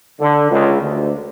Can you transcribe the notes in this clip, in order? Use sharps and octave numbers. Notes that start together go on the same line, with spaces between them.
D3
C#2
D2